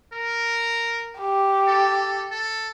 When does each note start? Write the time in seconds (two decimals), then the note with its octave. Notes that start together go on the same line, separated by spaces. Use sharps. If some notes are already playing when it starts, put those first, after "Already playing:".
0.13 A#4
1.19 G4
1.67 A4
2.31 A4